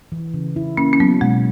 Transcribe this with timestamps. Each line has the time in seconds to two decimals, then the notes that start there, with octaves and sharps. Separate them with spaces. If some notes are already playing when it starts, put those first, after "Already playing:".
0.12 E3
0.34 C#3
0.56 E4
0.77 A#3 C#4
0.93 C#4
1.00 F#3 B3
1.21 B2 G#3